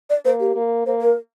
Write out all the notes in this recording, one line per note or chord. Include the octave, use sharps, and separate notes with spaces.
D5
A#3 C5
G4
A#3
A#3 C5
A#4